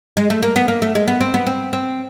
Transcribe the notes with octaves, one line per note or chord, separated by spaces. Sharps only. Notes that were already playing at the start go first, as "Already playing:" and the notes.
G#3
A3
A#3
B3
A#3
A3
G#3
B3
C4
B3
C4
C4